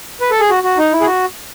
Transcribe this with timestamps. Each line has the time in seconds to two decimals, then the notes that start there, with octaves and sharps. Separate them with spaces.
0.21 B4
0.31 A4
0.40 G#4
0.50 F#4
0.63 F#4
0.78 D#4
0.93 E4
1.01 G#4
1.06 F#4